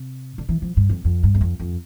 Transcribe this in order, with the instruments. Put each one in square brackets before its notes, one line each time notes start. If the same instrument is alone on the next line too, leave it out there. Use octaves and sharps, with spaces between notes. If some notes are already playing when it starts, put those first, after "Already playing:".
Already playing: [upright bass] C3
D3
E3
F3
G2
F2
F2
G2
E2
F2
F2